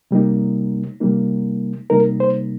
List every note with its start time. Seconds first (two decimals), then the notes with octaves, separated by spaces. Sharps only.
0.11 C3 G3 A#3 D#4
1.00 C3 G3 A#3 D#4
1.90 C3 G3 A#3 D#4 A#4
2.20 C5